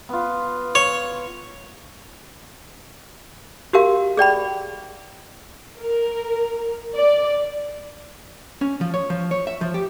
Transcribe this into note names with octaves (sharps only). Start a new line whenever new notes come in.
B3 F4
C#5
F#4 G4 A#4 F5
G#4 D5 G5 B5
A#4
D5
C#4
F3
C#5
F3
C#5
E5
F3
G4